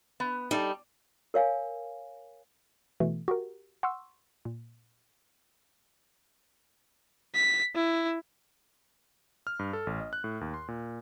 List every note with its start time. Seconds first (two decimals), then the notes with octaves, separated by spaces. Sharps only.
0.20 B3
0.51 G3 D#4 A4 D#5
1.34 A#4 C#5 F5 G#5
3.00 B2 E3 A3
3.28 F#4 G4 A#4
3.83 F#5 C6 C#6 E6
4.45 A#2
7.35 B6
7.76 E4
9.47 F6
9.59 G2
9.73 A4
9.87 A1
10.00 D#5
10.13 F#6
10.24 A2
10.41 D#2
10.54 C6
10.68 A#2